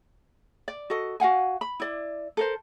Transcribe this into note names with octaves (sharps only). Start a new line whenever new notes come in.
D5
F#4 A4 D#5
F#4 F5 F#5 G#5
B5
E4 D5
A4 A#4 C5